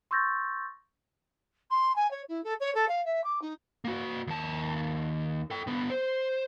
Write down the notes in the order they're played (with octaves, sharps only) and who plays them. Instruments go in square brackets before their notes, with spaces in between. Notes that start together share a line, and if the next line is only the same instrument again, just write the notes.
[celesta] C6 C#6 E6 G6 A6 A#6
[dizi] C6
G#5
C#5
E4
A4
C#5
A4
F5
E5
D6
D#4
[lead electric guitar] A#3 F#4
D#2 A5
A4 G5
D3 B3
C5